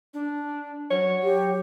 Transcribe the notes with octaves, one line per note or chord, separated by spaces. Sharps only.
D4
F#3 C#5
G4